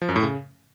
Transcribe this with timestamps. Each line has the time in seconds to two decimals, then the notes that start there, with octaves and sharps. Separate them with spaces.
0.02 F3
0.09 F#2
0.16 A2
0.23 C#3